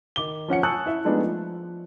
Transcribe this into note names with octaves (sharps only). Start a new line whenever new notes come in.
D#3 D6 G7
F3 C#4 F#5 C#7
G#5 A5 C#6 D#6 E6 F#6
E4 E5
F3 G#3 A3 B3 D4 D#4
F3